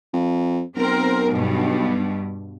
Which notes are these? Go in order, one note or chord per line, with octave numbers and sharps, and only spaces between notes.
F2
B1 C4 A#4
G2 B2